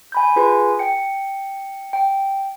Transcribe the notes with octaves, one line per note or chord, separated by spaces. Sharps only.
G#5 B5 G6
F4 G#4 B4 G#5
G5 C#7
G5